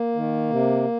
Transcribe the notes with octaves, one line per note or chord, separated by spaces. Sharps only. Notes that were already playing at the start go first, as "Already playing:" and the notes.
Already playing: A#3
D#3
C3